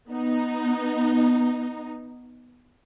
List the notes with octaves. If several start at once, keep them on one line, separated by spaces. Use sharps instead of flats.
B3 D#4